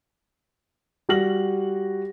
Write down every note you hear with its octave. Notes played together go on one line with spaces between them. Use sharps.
G3 F#4 A#6 F#7